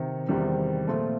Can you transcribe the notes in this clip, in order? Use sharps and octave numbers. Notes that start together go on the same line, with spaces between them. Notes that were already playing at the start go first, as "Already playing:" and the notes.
Already playing: C3 D#3
E2 C3 D#3 G3
A#2 F3 A3 C4 F4